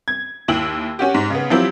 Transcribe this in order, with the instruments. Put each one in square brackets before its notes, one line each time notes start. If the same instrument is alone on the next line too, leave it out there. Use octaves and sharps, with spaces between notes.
[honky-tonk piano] G#6
D#2 E4 G5 E6 F#7
C#4 F#4 G4
G#2
C#3 B3
F3 F#3 C4 E4 G4